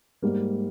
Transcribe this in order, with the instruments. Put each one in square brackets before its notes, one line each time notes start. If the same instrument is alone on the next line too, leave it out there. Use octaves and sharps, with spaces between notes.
[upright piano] G#2 G3 A#3